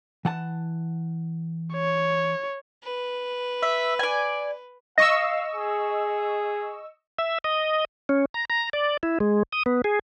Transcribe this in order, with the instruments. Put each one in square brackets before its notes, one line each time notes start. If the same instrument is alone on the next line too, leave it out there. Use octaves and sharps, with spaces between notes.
[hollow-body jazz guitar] E3 F#5 A5
[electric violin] C#5
[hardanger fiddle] B4
[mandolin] E5
D5 G#5
[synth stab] D#5 C#6 E6 [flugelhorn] F5 [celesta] A#6
[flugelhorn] G#4
[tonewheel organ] E5
D#5
C#4
A#5
A#5
D5
E4
G#3
D#6
B3
G#4